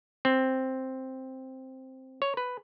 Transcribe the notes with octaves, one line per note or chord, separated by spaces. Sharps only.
C4
C#5
B4